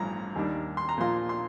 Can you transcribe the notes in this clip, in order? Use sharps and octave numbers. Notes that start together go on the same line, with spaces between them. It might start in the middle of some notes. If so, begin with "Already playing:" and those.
Already playing: A1 G2 F3 A#5
D#2 D#3 G3 D4
C6
A#5
A#2 F3 A#3 F4 C6
C6